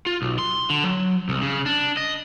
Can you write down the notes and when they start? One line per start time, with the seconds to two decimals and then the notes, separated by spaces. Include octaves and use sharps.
0.06 F4
0.22 B1
0.39 C6
0.70 D3
0.84 F#3
1.29 C2
1.41 C#3
1.66 D4
1.97 D#5